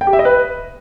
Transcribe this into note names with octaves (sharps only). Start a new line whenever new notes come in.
G5
G4
E5
D#5
B4